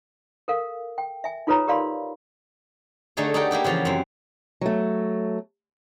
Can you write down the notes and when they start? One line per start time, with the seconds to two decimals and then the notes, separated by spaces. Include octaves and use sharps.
0.48 A4 A#4 F5
0.98 G5
1.24 E5 G#5
1.47 D#4 F4 A4 B4 C#5 A#5
1.67 G4 A#4 D5 F5 B5 C6
3.17 D3 A3 D#4 G#4 C#5
3.34 D#4 G4 A4 A#4 F#5 G5
3.51 A#3 E4 G4 B4
3.64 C#3 E3 F3 G4 F#5
3.85 F#2 C4
4.61 F#3 A3